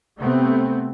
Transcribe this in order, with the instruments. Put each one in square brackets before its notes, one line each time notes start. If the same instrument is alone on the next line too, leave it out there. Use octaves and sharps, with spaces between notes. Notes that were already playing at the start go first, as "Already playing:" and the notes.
[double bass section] C3 A3 B3 C4